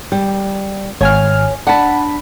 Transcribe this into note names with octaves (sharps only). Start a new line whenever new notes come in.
G3
G#1 C#5 G#5 F6
D4 F#5 A5 B5